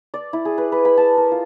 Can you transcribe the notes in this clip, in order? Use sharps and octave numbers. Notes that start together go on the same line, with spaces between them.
D5
E4
G#4
B4
B4
B5
A5
A#4
F4